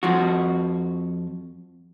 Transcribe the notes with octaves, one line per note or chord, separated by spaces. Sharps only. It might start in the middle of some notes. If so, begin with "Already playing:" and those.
F2 F3 F#4